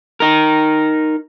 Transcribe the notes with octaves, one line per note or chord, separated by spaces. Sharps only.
D#4 A#4